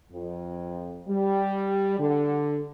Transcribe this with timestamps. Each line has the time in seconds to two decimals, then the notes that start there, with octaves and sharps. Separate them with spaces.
0.12 F2
1.08 G3
1.99 D3